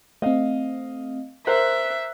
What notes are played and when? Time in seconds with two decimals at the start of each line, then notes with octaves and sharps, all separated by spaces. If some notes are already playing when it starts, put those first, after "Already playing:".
0.22 A3 C4 D#5 F5
1.47 A#4 C5 E5 F#6